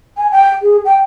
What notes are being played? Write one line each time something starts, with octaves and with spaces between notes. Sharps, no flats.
G#5
G5
G#4
G5